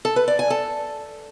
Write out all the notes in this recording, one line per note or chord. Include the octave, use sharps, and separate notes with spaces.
A4
B4
D5
G#5
A4